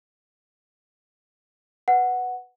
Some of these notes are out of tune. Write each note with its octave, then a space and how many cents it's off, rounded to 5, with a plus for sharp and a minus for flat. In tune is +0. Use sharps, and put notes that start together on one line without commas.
B4 +0 F#5 +0